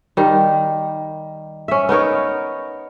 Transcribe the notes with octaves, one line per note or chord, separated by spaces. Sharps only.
D#3 G3
C#4 E5
B3 D#4 A#4 C#5